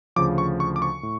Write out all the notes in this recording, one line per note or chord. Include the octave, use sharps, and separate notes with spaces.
D2 C#3 F3 D6
C#6
C#6
D6
C#6
A2